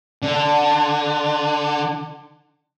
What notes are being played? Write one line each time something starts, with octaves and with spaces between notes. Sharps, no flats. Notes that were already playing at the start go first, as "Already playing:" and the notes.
D3